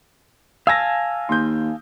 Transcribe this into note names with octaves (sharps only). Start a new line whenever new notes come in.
F5 G#5 A5 E6 A#6
D#2 C6 G6